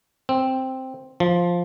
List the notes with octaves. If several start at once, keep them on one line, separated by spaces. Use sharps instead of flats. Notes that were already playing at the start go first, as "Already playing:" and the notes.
C4
F3